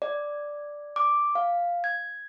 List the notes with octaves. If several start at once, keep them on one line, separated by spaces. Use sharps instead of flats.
D5
D6
F5
G#6